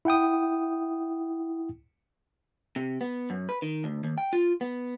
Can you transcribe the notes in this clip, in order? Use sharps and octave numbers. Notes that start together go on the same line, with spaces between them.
E4 F#5 G5 D#6
C3
B3
F#2
B4
D#3
D2
D#2
G5
F4
B3